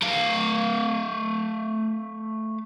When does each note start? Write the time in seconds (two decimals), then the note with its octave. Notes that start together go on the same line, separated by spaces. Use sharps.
0.02 A3 F5